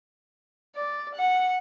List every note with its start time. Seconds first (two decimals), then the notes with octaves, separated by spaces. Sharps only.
0.76 D5
1.15 F#5